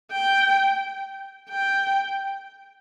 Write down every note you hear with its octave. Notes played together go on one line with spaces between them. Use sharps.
G5
G5